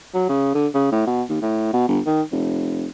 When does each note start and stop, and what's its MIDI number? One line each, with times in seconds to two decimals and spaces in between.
0.14 0.26 54
0.29 0.51 49
0.55 0.67 50
0.74 0.88 49
0.92 1.05 45
1.07 1.23 47
1.30 1.40 39
1.42 1.72 45
1.73 1.86 47
1.88 2.00 31
2.06 2.22 51
2.32 2.87 29